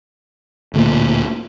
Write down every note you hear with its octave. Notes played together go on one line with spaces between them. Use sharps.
D1 D2 A#2